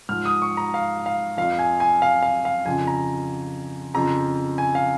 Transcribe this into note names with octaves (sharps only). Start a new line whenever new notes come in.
G#2 F3 F6
D#6
C#6
A#5
F5
F5
F2 F3 F5
G#5
G#5
F5
F5
F5
F2 C#3 F3 G#5
A#5
F2 C#3 F3 A#5
G#5
F5